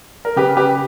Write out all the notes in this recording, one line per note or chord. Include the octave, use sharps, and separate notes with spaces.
A#4
C#3 G4 B4
G4 B4